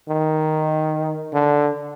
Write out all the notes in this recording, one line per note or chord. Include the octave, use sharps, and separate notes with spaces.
D#3
D3